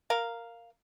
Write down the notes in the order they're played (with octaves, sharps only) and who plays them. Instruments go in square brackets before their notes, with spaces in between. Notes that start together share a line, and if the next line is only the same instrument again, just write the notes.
[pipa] A#4 F5